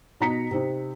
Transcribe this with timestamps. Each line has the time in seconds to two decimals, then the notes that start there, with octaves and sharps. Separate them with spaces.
0.20 B2 D#4 A#5 B6 C#7
0.51 C3 C4 D#4